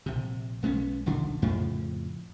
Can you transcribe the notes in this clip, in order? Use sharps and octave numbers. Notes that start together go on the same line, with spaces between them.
A#1 C3
B1 G#3 B3 C#4
D#1 B1 D3 D4
F2 A2 C#3 F3